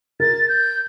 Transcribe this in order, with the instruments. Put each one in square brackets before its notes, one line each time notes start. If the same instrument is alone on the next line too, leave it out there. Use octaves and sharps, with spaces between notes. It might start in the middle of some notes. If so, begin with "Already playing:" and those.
[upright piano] A#4 [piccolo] A6
[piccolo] G6